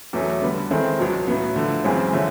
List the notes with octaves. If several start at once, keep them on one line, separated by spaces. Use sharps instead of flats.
E2 B2 F#3 A3 C#4
D3 G3 B3
D#3 G#3 C4 E4 A4
C#2 B2 F#3
A2 F#3 B3
D3 F3 A3
F#2 C#3 E3 G#3 C4
D3 F3 A3 C#4